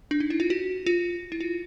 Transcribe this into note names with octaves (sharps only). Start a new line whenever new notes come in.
D4
D#4
E4
F4
F#4
F4
E4
F4